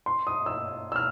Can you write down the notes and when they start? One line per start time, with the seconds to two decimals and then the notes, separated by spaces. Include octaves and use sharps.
0.06 C6
0.27 D#6
0.46 E6
0.92 E6
0.96 F6